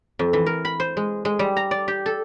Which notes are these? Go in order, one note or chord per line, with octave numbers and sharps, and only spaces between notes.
F2
E3
A#4
B5
C5
G#3
G#3
G3
A#5
D5
G4
A4